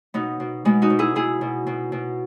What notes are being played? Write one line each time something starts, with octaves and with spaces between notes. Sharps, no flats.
B2 B3 D#4
B2
B2 G#3 B3
D#4 F#4
B2
E4 G#4
B2 E4 G#4
B2
B2
B2